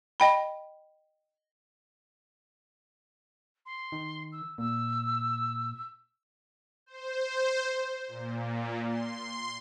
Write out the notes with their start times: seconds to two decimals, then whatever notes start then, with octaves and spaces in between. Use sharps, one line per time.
0.20 D#5 G5 B5
3.66 C6
3.92 D#3
4.32 E6
4.58 A#2 E6
6.86 C5
8.08 A#2
8.86 C6